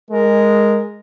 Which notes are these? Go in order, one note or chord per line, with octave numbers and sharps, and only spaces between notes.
G#3 A#4